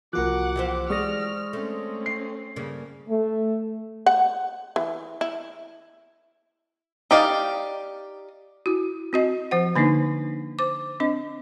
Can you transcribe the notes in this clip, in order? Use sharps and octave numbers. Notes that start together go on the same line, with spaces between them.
C2 F3 A#3 F#4 A#4 F#5 D6 F#6
E3 G4 C5
G#3 D5 C#6 D#6 F6 A#6
A3 C4 C#4
C7
G2 C#3 A#3
A3
F#5
E3
E4
D#4 G4 D5 F5
E4 F#4
C4 F#4 D#5
F3 C5 F#5
D3 A#3 D4 D#4
C5 D6
C4 D4 D#5